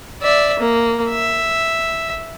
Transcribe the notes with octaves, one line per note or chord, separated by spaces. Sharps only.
D5 E5
A#3
E5